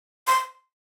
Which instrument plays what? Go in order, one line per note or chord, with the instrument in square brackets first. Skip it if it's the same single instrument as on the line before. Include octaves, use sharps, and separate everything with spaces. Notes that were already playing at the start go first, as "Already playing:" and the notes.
[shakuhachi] C6